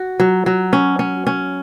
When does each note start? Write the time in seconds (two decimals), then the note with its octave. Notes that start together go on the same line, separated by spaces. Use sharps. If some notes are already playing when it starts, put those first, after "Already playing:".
Already playing: F#4
0.20 F#3
0.46 F#3
0.73 C#4
0.99 C#4
1.27 C#4